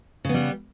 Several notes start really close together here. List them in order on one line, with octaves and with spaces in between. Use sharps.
C#3 B3 G3